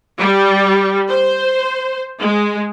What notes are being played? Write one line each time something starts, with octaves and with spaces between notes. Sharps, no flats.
G3
C5
G#3